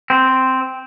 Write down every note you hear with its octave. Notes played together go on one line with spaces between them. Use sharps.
C4